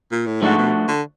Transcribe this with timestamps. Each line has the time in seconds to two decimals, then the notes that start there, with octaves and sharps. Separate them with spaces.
0.11 A#2
0.26 A2
0.42 G#2 F3 A3 D4 F#4
0.58 B2
0.88 D3